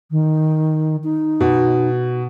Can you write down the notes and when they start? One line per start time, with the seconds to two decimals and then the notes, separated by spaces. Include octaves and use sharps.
0.11 D#3
1.04 D#4
1.41 B2